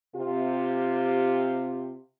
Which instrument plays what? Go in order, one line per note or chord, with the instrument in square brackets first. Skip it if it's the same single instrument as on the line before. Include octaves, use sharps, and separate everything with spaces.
[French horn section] C3 F4 G4